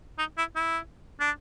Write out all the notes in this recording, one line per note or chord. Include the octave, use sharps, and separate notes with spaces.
D#4
E4
E4
D4